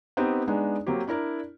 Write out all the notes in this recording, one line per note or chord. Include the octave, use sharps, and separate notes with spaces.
B3 C4 D#4 G4
G#3 B3 D4 D#4
F#3 A#3 C4 G4
D4 E4 A#4 D5